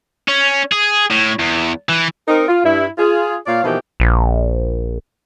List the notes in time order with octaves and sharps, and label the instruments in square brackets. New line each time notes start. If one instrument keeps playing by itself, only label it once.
[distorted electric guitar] C#4
G#4
A2
E2
E3
[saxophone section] C4 D#4 A#4
F4
G2 E4
F4 G#4
A#2 C#5 D5 F5
B2 E3 F3 A#3 D#4 G4
[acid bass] A#1